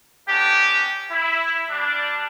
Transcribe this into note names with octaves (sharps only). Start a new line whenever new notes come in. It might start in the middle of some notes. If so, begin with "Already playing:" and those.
A3 B3 C#4 D4 G4
E4
G3 D4